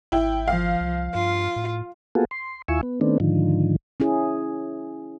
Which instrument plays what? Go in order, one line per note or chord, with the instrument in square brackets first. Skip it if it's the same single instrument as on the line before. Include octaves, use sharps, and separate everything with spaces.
[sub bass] G#1 [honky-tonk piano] E4 G5
[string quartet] F3 [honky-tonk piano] F5
[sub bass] C2
[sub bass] G2 [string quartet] F4
[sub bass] A2
[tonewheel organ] A#3 B3 F4 F#4 G#4 A4
C6
D#2 E4 F4 G#5 C#6 E6
B3
D#3 A3 B3 C4 D4
G#2 D3 D#3 F3
[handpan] C#4 E4 G#4